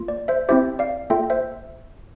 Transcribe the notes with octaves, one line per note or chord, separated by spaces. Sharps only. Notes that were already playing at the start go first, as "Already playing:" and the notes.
Already playing: A#3 F4
D5
C5 E5
C4 E4 G4 C5 E5
D5 F5
A#3 F4 A4 E5 G5
C5 E5